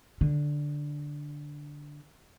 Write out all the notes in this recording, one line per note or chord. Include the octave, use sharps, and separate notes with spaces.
D3